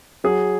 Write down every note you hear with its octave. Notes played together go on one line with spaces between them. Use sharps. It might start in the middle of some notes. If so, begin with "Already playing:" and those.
F#3 G#4